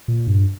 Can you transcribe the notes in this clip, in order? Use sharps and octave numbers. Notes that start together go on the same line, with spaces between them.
A#2
G2